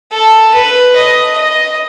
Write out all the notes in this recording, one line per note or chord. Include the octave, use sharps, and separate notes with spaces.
A4
B4
D#5
D#5